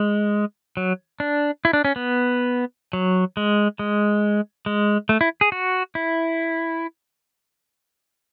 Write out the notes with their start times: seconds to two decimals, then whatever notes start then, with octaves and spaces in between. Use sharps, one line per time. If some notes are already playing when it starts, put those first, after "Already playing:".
Already playing: G#3
0.77 F#3
1.20 D4
1.65 E4
1.73 D4
1.85 C#4
1.96 B3
2.93 F#3
3.37 G#3
3.79 G#3
4.66 G#3
5.09 A3
5.21 E4
5.41 G#4
5.52 F#4
5.95 E4